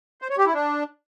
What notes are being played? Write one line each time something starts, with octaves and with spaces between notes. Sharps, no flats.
C5
C#5
G4
E4
D4